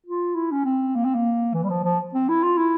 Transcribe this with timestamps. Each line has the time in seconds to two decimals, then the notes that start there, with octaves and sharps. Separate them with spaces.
0.06 F4
0.35 E4
0.51 C#4
0.65 C4
0.95 A#3
1.05 C4
1.14 A#3
1.54 E3
1.64 G3
1.69 F3
1.84 F3
2.14 C4
2.28 E4
2.43 F4
2.57 E4